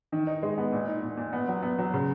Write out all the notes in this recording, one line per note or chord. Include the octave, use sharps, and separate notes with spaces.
D#3
D#4
G#3
B3
A#2
D#4
A#2
A#2
B3
F#3
B3
F#3
C#3